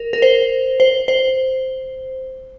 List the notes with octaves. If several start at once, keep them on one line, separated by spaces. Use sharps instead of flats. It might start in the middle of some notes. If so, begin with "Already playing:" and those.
Already playing: A#4
A#4
C5
C5
C5